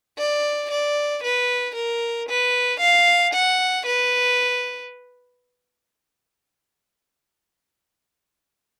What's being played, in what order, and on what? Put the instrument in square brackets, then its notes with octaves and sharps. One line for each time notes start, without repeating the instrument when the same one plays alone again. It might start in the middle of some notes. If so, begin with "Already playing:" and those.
[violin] D5
D5
B4
A#4
B4
F5
F#5
B4